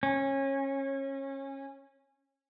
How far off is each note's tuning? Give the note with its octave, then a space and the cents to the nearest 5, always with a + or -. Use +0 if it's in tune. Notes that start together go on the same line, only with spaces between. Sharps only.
C#4 -25